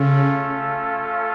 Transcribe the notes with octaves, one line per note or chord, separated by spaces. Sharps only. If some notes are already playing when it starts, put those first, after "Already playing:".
Already playing: C#3 A3 C#4 F4 A4